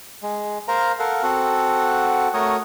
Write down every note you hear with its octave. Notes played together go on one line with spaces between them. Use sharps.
G#3
A#4 C5 F5 A#5
A4 A#4 F5 F#5
C4 F#4 A4 F#5
A3 F#4 A#4 C#5 D#6